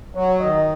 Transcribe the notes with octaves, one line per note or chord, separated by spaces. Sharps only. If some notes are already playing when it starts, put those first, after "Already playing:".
F#3 C#5
D#3 D#5